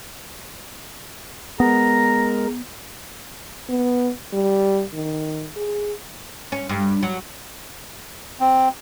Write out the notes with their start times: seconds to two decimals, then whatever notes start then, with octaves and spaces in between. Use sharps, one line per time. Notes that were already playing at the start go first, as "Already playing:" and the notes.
1.60 G#3 B3 A#4 A#5
3.69 B3
4.33 G3
4.94 D#3
5.56 G#4
6.52 C#4
6.69 G2
7.03 F#3
8.40 C4